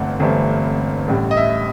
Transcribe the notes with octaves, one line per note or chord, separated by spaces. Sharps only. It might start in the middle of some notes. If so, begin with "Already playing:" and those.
Already playing: G1 G2 E3 A3 C4 F#5
G1 G2 E3 A3 C4
A1 A2 G3
D#5
E5